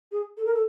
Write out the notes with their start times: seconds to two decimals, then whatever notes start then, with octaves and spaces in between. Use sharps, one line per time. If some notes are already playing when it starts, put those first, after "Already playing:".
0.11 G#4
0.37 A4
0.45 A#4
0.53 A4